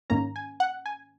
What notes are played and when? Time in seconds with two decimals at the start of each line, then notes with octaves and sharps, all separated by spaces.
0.10 G#2 D#3 A#3 C#4 A#5
0.36 G#5
0.60 F#5
0.86 G#5